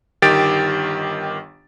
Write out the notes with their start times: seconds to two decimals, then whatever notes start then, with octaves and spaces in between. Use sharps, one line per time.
0.22 G1 D#3 G4 A6 D7